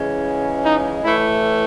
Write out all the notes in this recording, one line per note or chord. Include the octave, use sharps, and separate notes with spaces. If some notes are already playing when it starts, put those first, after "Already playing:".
Already playing: C#3 E3 G#3 C#4
D#4
A2 E3 A3 E4